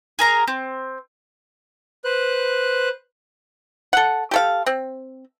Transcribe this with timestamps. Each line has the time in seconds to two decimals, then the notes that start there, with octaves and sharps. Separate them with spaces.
0.19 G#4 A#4 A#5
0.48 C4
2.05 B4 C5 F#6
3.93 A4 F#5
4.31 G4 A4 F5
4.66 C4